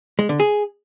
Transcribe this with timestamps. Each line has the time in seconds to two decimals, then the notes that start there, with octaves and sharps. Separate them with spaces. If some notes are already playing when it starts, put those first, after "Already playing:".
0.19 G#3
0.29 D3
0.40 G#4